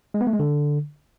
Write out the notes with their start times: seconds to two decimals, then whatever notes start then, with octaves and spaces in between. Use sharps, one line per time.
0.14 G#3
0.21 B3
0.27 A3
0.33 G#3
0.40 D3